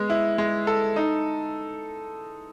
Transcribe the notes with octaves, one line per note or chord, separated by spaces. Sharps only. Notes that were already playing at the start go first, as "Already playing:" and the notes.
Already playing: G#3 B3
E4
G#3
A4
D#4